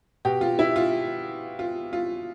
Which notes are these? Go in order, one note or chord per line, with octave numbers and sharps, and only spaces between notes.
B2 G4
F4
E4
F4
F4
F4